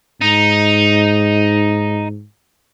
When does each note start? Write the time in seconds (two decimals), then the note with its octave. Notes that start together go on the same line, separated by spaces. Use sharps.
0.22 G#2 D#4